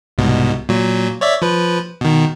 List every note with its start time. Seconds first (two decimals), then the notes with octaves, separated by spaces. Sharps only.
0.18 C2 G#2 B2
0.69 A#2 F#3
1.21 C#5 D5 E5
1.42 F3 B4
2.01 B2 D#3